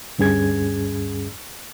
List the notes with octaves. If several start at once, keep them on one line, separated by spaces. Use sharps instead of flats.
D2 G2 C#4 G#4 G#6